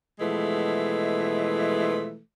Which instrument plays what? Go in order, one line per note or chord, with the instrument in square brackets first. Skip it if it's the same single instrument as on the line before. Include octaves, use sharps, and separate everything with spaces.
[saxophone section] B2 E3 F3 G#3 A3